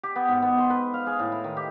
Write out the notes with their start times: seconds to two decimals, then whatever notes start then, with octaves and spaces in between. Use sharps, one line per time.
0.03 G4
0.16 B3
0.28 G#2
0.42 B3
0.58 C6
0.70 B4
0.94 F5
1.07 G#4
1.19 A2
1.32 E4
1.44 D#3
1.57 G4